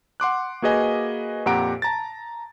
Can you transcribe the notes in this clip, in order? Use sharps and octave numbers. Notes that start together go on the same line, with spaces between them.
F#5 C6 D6 F#6
A#3 F#4 G#4 B4 D#5 G#5
F2 A#2 G4 F#5 A#5 D7
A5 A#5 A6